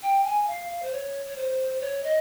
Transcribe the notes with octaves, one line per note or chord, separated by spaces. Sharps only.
G5
G#5
F5
F5
C5
C#5
C#5
C5
C#5
D#5